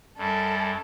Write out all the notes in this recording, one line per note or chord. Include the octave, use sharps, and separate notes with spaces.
F#2 G3 A4